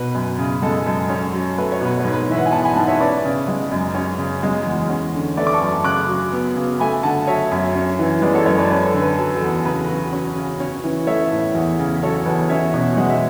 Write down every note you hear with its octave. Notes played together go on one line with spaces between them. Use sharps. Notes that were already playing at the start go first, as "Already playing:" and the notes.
Already playing: B2 B4
F#2
C#3
G#3 A4
F#2
C#4
F#3
A3 B4
C#5
B2 B4
C#5
G#2
B4
E3 E5
F#5
G#5
B3 F#5 A5
G#5 B5
G#2 F#5 A5
C#5 E5
C#4 B4 D5
C#3
G#3
F#2
C#4
C#3
G#3
E2
C#4
D3
A3 B4 D5
D6
A5 C#6
F#2
C#3 D6 F#6
F#3
B3
C#3
A3 G#5 B5
D3 F#5 A5
F#3 C#5 E5
F#2
C#4
E3
G#3 B4 D5
A4 C#5
F#2 A4 C#5
B4 D5
C#4 B4
A4
D3
B4
F#3 A4
E2 A4
C#3 B4
F#3
C#4
C#3
C#4
E3
A3 C#5 E5
A2
E2
C#3
F#3 A4 C#5
E2 B4
C#4 C#5 E5
B2
G#3 F#5
E5